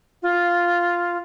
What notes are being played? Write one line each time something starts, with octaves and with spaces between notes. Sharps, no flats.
F4